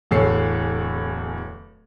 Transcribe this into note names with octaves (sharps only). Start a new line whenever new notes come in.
D1 E2 A4 C#5 C7